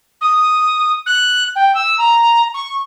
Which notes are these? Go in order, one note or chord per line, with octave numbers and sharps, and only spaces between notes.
D#6
F#6
G5
E6
A#5
C#6